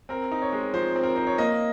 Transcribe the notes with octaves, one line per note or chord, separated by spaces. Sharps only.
C4 A#4
D#4
C#5
G#3
F3 C5
C4
A#4
D#4 C5
C#5
A#3 D#5